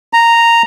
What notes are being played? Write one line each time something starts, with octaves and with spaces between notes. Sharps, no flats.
A#5